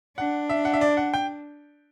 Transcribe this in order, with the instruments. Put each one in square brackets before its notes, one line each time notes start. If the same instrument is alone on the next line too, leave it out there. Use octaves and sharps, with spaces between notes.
[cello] D4 [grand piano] F#5
[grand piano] E5
F#5
E5
D5
F#5
G5